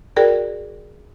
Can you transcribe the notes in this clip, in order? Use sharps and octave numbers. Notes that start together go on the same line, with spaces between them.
F#4 G#4 A#4 D5 G5